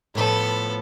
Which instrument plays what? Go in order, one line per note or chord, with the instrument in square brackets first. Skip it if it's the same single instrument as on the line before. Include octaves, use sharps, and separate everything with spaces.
[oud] A2 F3 [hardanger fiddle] B3 A4